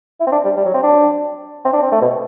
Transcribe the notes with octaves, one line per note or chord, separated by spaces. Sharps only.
E4
C4
D4
G3
G3
F#3
C4
D4
C4
D4
C4
A3
B2